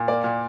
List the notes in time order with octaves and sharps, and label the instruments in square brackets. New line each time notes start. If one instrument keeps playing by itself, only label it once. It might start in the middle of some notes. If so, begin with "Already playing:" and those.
Already playing: [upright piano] A#2
A#3 D5
A#2